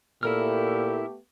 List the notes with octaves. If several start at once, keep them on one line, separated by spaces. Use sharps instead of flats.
A#2 A3 B3 E4 G4 A4 A#4 F6